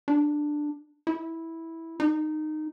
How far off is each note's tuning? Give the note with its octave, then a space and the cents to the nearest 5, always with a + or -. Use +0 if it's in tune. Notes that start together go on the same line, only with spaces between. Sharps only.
D4 +10
E4 -10
D#4 -15